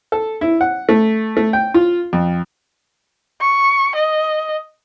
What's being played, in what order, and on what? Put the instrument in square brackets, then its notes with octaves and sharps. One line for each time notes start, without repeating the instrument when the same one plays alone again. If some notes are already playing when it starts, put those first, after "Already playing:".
[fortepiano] A4
E4
F#5
A3
A3
G5
F4
F2
[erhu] C#6
D#5